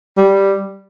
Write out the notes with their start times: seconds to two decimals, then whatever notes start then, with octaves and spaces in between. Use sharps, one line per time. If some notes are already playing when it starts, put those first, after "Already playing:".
0.17 G3